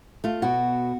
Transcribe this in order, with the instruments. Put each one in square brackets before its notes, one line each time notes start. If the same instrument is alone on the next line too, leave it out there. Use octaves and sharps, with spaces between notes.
[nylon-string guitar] A3 F4
[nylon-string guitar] B2 [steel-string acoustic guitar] F#4